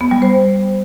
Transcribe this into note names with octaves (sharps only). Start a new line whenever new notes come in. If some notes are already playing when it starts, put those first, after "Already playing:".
B3
G3
C5